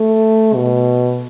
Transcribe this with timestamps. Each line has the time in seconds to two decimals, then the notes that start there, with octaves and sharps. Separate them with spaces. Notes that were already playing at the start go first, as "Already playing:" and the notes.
Already playing: A3
0.55 B2